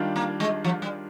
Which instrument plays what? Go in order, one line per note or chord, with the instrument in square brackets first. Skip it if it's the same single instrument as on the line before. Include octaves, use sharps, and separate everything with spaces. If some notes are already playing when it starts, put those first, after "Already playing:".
Already playing: [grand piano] D#3 G3 D4 F4
[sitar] A#3
G#3
F3
G3